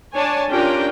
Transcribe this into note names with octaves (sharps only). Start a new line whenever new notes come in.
D4 C#5 G#5 A5
C#4 D4 F4 G4 A#4 G5